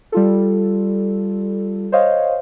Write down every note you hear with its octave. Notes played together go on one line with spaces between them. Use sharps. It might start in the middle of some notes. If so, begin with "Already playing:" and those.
G3 F4 A4
C5 C#5 D#5 F5